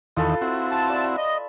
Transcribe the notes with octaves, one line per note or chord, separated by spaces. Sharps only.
E2 D#3 F4 A4 B4
C4 E4 F#4
A5
D5 E5
D#5